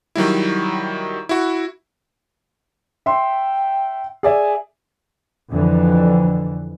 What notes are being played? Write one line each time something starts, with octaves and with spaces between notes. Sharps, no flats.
D#3 F#3 G3 E4
E4 F#4
E5 G5 C6
G#4 D5 E5 G#5
F2 D3 E3